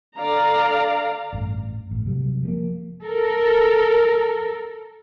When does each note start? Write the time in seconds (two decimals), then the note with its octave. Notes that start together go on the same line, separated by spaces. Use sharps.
0.18 D3 D5 F5 A#5
1.33 A1 G2
1.91 A1
2.06 C3 F#3 G3
2.43 F3 G#3 A#3
3.03 A4 A#4